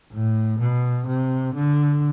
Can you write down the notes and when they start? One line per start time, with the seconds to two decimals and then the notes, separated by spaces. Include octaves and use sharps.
0.12 A2
0.59 B2
1.07 C3
1.54 D3